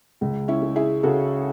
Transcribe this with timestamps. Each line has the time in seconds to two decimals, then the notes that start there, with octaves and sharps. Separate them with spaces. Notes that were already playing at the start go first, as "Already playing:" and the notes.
0.21 C#2
0.48 C#4 E4
0.62 G#3
0.76 E4 G#4
1.03 C#3 F#4 A4